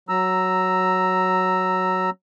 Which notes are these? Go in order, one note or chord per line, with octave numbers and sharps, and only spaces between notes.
F#3 A#5 E6